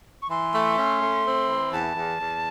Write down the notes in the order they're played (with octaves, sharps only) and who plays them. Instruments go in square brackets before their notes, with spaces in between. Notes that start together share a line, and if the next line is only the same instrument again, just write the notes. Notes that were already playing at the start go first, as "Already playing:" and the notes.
[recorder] C#6
[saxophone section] E3 [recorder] C6
[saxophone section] A3
C#4
A3
C4
E3
[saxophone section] E2 [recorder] A5
[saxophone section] E2
E2